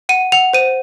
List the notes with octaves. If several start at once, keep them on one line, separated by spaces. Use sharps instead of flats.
F#5 D#7
F#5 F7
C5 D#7